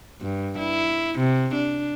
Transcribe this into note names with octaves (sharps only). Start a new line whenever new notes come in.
G2
E4
C3
D4